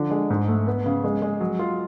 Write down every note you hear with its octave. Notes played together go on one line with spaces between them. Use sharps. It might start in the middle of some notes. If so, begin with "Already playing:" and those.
Already playing: D3 F3
G#3
G#2
A3
B3
C#3
G#3
G#3
F#3
F4